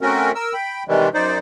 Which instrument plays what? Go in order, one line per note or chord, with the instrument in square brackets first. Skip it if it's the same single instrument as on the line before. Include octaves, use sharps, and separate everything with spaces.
[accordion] A3 C4 C#4 F#4 A#4
A#4 E6
G5 B5
C3 D#3 E3 G3 G#3
F#2 D#4 C5 D5